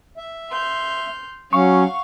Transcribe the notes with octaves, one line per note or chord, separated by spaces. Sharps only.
E5
C6 F6 G6
F#3 C#4 F5 F#5 C#6